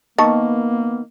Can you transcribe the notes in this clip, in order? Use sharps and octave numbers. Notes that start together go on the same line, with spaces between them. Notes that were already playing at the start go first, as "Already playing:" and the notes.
D#3 A#3 B3 A5 C#6